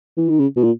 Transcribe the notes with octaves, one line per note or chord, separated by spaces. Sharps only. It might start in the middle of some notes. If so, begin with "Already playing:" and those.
E3
D#3
C#3
B2
A#2